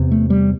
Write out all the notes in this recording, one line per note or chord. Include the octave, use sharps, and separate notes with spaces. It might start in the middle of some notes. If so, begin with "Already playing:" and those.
Already playing: E2 C3
A3
G3